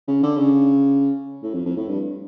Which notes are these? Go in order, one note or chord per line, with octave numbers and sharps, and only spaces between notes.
C#3
D3
C#3
A2
F2
F2
A2
G2